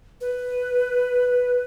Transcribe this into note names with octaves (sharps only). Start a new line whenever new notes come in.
B4